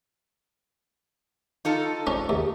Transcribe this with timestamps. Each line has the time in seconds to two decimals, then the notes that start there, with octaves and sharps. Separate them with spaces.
1.65 D#4 F4 A4
2.07 C#4 D4 C5
2.29 D#2